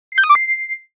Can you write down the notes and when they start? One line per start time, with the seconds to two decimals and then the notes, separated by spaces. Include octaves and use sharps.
0.12 C7
0.18 G6
0.24 D#6
0.29 D6
0.35 C7